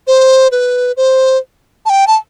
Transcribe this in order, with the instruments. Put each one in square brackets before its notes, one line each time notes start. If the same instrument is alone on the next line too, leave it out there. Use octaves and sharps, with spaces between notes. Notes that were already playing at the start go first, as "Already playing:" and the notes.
[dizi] C5
B4
C5
A5
G5
A5